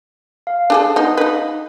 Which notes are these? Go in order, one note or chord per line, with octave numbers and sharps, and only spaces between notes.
F5
D4 G#4 A4
B3 D#4
D#4 B4